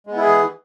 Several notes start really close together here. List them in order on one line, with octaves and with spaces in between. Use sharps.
G#3 B3 E4 G#4 E3